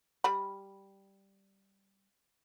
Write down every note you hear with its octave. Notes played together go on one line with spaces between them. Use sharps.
G3 B5